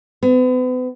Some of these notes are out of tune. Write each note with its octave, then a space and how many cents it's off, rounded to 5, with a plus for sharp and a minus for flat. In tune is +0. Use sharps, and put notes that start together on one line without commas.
B3 +40